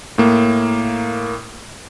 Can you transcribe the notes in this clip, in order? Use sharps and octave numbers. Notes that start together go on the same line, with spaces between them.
A2 A#3